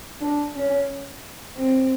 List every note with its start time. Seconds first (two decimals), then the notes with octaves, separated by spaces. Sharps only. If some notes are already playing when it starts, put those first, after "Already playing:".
0.21 D4
0.55 C#4
1.56 C4